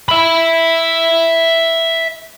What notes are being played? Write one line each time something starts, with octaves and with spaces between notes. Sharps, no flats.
E5 B5